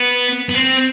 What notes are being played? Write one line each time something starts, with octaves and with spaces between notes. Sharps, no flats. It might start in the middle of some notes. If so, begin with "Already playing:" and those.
Already playing: B3
B3
C4